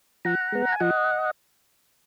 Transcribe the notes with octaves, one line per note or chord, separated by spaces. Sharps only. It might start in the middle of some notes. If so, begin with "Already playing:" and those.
F3 F#5 A#5
G#3 B3
G#5
F3 D#5 F#5